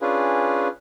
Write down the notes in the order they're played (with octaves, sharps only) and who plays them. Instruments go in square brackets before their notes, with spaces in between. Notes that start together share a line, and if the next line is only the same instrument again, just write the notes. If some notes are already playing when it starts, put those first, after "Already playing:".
[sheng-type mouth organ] C#4 D4 F4 G#4 B4